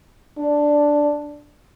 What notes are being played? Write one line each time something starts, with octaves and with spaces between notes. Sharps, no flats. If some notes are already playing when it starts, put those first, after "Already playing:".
D4